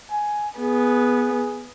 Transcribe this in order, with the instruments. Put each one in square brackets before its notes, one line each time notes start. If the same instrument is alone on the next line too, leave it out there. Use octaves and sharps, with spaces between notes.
[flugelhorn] G#5
[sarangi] B3 [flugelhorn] G#4